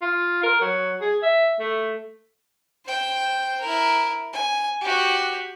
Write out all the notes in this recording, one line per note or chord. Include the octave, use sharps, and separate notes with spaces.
F4
A#4
F#3
G#4
E5
A3
C5 G5
E4 A#4
G#5
F#4 G4